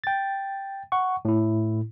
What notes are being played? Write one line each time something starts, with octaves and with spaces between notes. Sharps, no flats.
G5 A6
F#5 C#6
A2 E4